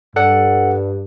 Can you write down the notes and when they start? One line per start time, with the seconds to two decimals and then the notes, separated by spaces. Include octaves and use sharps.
0.16 G2 A4 D5 F#5